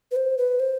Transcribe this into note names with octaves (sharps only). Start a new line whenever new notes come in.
B4
C5
B4
C5